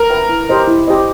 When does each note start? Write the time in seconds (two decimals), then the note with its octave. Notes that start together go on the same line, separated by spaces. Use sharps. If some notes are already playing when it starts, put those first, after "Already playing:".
Already playing: A#4
0.10 B4 E5 G5
0.29 E4
0.49 G4 C5 D#5
0.67 E4
0.88 G4 C5 D#5